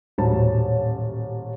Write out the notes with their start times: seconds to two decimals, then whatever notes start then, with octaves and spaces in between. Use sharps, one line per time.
0.18 D#1 A1 F#3 C#4 C5 A5